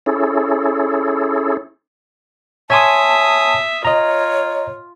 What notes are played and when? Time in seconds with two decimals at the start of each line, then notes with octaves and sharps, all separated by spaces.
0.06 C#4 E4 G#4 A4
2.70 C#5 E5 G#5 A5 C6 D#6
3.85 F4 C#5 D#5 A#5